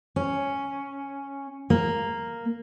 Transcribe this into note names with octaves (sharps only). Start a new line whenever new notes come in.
C#4
A#3